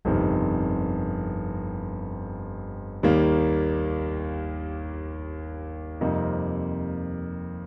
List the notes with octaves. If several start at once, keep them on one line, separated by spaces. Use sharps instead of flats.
G1 F2 C3 D#3
D#2 D#3 G3 A#3
F2 C3 G3 A#3 D#4